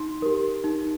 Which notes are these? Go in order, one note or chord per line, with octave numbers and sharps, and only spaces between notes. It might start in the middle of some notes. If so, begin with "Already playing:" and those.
Already playing: D#4 C6
G4 A#4
D#4